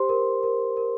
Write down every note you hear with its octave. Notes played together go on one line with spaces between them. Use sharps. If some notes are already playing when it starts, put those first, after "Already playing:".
Already playing: G4 C5 C6
A#4
A#4
A#4